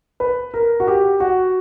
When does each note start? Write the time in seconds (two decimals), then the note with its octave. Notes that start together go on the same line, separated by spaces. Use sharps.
0.20 B4
0.54 A#4
0.80 F#4
0.87 G4
1.20 F#4